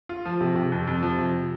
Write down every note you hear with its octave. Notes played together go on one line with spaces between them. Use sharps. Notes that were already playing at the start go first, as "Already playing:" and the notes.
F4
F3
C3
C3
F2
F2
F3
C3